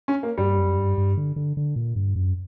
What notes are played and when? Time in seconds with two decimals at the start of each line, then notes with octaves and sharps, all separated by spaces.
0.08 C#4
0.23 A#3
0.38 G2 G3
0.58 F#2
0.77 G2
0.97 G2
1.17 D3
1.36 D3
1.57 D3
1.76 A#2
1.96 G2
2.16 F#2